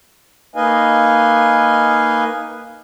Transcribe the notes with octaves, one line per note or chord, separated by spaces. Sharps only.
A#3 D#4 B4 D#5 F5 G#5